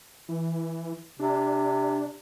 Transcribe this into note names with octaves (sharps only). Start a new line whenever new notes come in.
E3
C3 D4